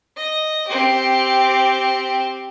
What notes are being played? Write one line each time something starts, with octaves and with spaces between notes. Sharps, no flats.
D#5
C4 G4